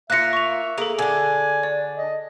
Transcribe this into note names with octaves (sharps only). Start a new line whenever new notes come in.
A#3 F4 E5 F#6 A#6 C#7
C#6 F7
A#3 G#4 A4
D3 D4 G#5
D5
D#5